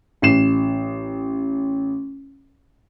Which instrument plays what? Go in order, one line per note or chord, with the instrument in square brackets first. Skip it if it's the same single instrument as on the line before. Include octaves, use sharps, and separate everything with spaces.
[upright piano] A1 C7 E7